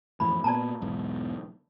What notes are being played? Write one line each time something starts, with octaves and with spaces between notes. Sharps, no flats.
F2 A2 E3 B5
A#2 B3 D5 A5 A#5
B1 E2 G#2